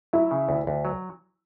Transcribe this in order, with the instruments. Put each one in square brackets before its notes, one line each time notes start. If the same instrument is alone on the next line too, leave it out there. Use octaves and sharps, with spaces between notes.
[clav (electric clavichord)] F#3 [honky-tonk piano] E4
[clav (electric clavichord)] C#3
D2
D2
F#3